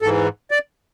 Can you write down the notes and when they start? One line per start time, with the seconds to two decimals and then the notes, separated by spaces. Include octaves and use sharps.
0.02 G#2 E3 A4
0.51 D5